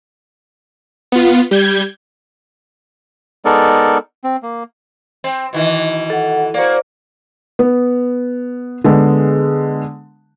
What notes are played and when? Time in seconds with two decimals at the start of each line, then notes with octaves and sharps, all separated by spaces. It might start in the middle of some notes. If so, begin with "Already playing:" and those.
1.12 B3 F4
1.51 G3 G6 G#6
3.45 G#3 B3 D#4 A4 A#4 D5
4.24 C4
4.43 A#3
5.24 C4
5.53 B2 D#3 E3
6.10 A4 F#5
6.54 A#3 F#4 C5 D5
7.59 B3
8.84 D3 G#3 B3